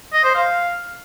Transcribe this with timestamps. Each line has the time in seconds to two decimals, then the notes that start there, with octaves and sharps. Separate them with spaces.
0.13 D#5
0.24 C5
0.35 F5